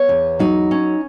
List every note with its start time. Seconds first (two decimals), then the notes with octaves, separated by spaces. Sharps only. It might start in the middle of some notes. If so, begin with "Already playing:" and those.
Already playing: B3 C#5
0.09 E2
0.39 F#3 D#4
0.71 C#4